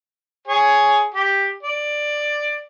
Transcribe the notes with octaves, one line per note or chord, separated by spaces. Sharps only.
G#4 C#5
G4
D5